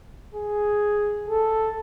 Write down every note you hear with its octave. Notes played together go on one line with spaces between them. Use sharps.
G#4
A4